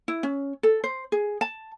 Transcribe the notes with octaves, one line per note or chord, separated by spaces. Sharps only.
E4
C#4
A4
C5
G#4
A5